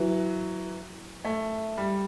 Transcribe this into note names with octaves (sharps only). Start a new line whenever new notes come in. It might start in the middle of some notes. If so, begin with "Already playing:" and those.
Already playing: E3 F#3
A3
G3